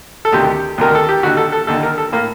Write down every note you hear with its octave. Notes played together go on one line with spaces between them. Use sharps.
A4
D2 C3 D#3 G4
D2 C3 D#3 A#4
A4
G4
D#2 D3 F#4
A4
A4
D#2 D3 A4
A#4
A4
A2 A#3